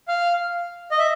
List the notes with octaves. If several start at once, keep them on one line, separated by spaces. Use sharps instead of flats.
F5
D#5
E5